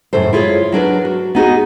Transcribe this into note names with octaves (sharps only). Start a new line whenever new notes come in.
F#2 A2 C#3 A4 C5
E4 F4 G#4 C5 C#5
F#3 D4 A#4 B4
F#4
B3 D#4 F#4 G#4